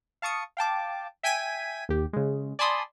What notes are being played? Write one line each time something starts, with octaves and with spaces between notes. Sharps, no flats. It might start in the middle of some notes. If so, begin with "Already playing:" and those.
F5 A5 C#6 D#6 C#7
F5 G5 A5 D6
E5 G5 G#5 G#6 B6 D#7
D#2 G4
C#3 G#3
D5 G#5 A5 B5 C6 D#6